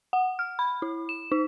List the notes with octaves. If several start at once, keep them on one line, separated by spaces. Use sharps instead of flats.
F#5
F6
B5
E4
E7
D#4